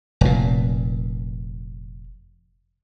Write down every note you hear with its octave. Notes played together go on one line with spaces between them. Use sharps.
F1 A#2